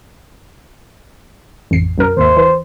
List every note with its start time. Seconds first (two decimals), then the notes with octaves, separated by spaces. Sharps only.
1.71 A1 F2 C7
1.98 B1 F#2 A#4
2.17 G#1 D#2 C5 E5
2.37 E3